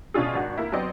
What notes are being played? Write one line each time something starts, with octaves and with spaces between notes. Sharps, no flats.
B2 C#4 D4 F4 G#4
G#1 D4 F#4
A#3 E4
F#3 B3 C4 C5 D5 D#5